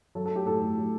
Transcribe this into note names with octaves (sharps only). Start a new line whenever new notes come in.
F#3 A4
A4
A3
G4
A2 A4
A2
F#3